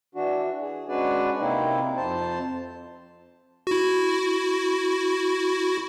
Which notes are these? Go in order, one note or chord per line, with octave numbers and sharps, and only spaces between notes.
E3 D4 F#4
G#4
G#3 C#4 D4 F#4 B4 D5
C3 A#3 C4 D#4 E4
F2 C5 A5
E4 F#4